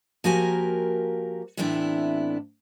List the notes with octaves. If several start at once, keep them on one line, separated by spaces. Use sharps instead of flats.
F3 A#3 F#4 G4 A#4 G#5
A2 E3 B3 C4 D4 E4